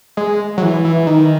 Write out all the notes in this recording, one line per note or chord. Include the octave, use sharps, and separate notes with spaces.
G#3
F#3
E3
E3
D#3